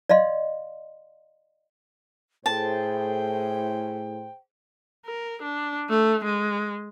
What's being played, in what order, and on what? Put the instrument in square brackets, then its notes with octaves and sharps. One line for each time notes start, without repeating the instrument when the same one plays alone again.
[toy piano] D5 D#5 F5 C6
[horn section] A2 [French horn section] G#4 C5 [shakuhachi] G5 [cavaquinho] A5
[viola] A#4
D4
A3
G#3